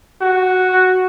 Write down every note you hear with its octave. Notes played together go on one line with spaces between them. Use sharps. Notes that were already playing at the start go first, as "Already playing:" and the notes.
F#4